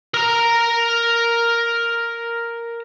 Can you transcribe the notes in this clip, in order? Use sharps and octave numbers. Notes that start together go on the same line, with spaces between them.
A#4 A#5